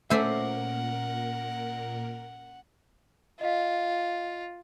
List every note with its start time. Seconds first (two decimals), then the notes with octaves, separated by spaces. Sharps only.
0.10 A#2 A3 C#4 A#4 C5 D5 E5 F#5
3.41 F4 D#5 F5